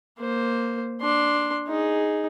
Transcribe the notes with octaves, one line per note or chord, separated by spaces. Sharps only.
A#3 C5
D4 C6
D#4 G#4